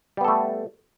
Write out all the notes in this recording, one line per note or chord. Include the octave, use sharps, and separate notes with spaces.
G3 A3 B3 A4